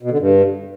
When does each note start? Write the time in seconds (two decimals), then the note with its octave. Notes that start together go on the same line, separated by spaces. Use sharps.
0.03 B2
0.11 D3
0.19 G2